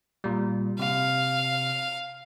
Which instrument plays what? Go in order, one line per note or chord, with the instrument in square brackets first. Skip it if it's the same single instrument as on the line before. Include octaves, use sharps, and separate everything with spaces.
[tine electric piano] A#2 G3
[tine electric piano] C3 [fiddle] F5